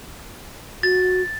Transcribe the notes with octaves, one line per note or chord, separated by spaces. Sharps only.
F#4 A6